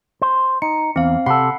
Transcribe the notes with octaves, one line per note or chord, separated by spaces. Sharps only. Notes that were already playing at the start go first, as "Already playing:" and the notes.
C5
D#4 C#7
E2 C4 F5
C3 A4 F#5 B5 C7